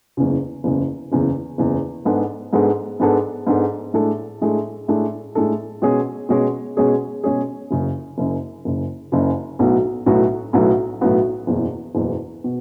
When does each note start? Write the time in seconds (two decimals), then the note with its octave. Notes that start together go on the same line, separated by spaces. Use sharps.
0.17 F#1 E2 C#3
0.64 F#1 E2 C#3
1.12 F#1 E2 C#3
1.58 F#1 E2 C#3
2.05 G#2 G#3 B3 D4 A4
2.53 G#2 G#3 B3 D4 A4
3.00 G#2 G#3 B3 D4 A4
3.47 G#2 G#3 B3 D4 A4
3.94 A2 G#3 D4 A4
4.41 A2 G#3 D4 A4
4.88 A2 G#3 D4 A4
5.35 A2 G#3 D4 A4
5.82 B2 G#3 C#4 G#4
6.29 B2 G#3 C#4 G#4
6.77 B2 G#3 C#4 G#4
7.24 B2 G#3 C#4 G#4
7.71 F#1 F#2 C#3
8.18 F#1 F#2 C#3
8.65 F#1 F#2 C#3
9.12 F#1 F#2 C#3
9.59 B1 A2 F#3 B3 F#4
10.06 B1 A2 F#3 B3 F#4
10.53 B1 A2 F#3 B3 F#4
11.01 B1 A2 F#3 B3 F#4
11.47 F#1 E2 B2
11.95 F#1 E2 B2
12.44 B2